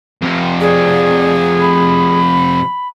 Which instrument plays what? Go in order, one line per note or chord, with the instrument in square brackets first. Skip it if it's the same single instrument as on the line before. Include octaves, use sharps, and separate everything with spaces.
[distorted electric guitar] F2 C3
[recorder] G#4 [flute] D5
[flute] B5